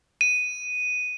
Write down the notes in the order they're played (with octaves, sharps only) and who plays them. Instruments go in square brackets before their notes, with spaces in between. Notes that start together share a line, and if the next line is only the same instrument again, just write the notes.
[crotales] D#7